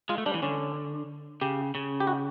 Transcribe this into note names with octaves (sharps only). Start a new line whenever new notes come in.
G#3 F4
A3
G3 D4
E3
D3 C#4
C#3 G4
C#3
G4
F#4